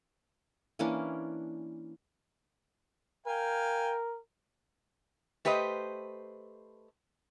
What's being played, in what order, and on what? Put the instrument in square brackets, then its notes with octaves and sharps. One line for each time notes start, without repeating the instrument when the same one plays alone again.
[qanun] E3 A#3 C#4 D4
[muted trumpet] A#4 [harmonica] F5 G5 G#5
[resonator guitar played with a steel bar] A3 G4 B4 C5 D#5